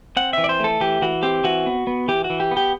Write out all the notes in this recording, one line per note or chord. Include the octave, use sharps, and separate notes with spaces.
C4 F#5
E3 E5
D5
C5
A3 A4
E3 G4
E3 F#4
C4 G4
E3 F#4
B3
B3
E3 G4
F#4
E3
G4
B3
G4